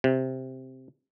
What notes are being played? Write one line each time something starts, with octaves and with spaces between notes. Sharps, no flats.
C3